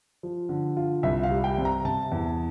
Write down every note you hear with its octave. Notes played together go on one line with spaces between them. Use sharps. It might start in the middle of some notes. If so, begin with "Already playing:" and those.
F3
D3
F4
C2 E5
F5
G3
G5
C3
A#5
C3 A5
E2